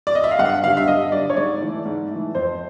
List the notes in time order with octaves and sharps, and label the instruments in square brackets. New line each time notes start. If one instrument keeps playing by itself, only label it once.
[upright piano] D5
D#5
E5
F5
G2 F#5
D3 G3 F5
E5
G2 D#5
D3 G3 D5
C#5
G#2 D5
E3 A3
G#2
E3 A3
F2 C5